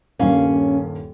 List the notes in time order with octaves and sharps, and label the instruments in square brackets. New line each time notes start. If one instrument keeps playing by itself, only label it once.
[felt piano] D#1 G2 A#3 [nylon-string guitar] C#4 F5